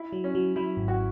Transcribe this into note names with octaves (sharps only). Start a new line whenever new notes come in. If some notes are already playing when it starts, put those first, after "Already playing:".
Already playing: E4
F#3
C#4
F#3
F#3 E4
G#1
F#4